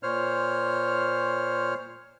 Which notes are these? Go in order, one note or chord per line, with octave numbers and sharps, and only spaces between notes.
A#2 C5 C#5 F6